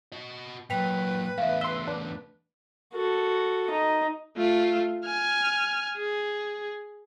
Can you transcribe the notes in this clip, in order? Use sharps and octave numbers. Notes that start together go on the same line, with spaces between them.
F#4 D#5
A#2 F#3 B4 G5 B6 F7
E2 A3 E5 F5
E5 C6 G7
D4
F#4 A4
D#4
A3 F4
G#5 F6
G#4